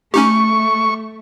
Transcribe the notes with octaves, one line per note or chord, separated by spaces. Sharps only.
A3 C#4 D#4 G4 C#6